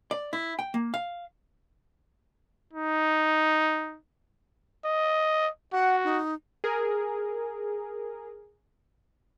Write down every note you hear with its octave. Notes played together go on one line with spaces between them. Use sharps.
D5
E4
G5
A#3
F5
D#4
D#5
F#4 F#5
D#4
G#4 A#4